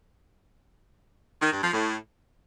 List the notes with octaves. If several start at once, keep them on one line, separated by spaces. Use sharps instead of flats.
D#3
G2
F3
A2